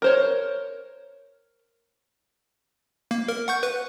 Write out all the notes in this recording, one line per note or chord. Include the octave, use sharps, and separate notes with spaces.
A#4 C5 C#5
A#3
A#4
F#5 C#6 G6
B4